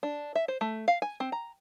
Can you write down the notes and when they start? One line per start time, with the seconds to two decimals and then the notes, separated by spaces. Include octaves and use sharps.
0.03 D4
0.35 E5
0.48 C5
0.61 A3
0.88 F5
1.02 G#5
1.20 C4
1.32 A#5